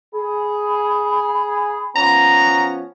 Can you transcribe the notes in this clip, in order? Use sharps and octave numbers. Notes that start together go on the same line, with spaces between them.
G#4 B5
F3 B3 C#4 A#5